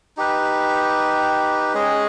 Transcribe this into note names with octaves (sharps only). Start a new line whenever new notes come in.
D#4 G4 B4
G#3 C#4 G#4 D#5